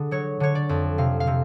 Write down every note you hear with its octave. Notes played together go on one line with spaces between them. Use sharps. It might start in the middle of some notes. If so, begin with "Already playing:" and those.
Already playing: D3 G#4
F#3 C#5
D3 C#5
D5
F2
C3 F5
F5
C3